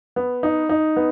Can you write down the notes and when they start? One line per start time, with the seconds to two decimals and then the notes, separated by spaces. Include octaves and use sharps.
0.16 B3
0.43 D#4
0.69 D#4
0.96 B3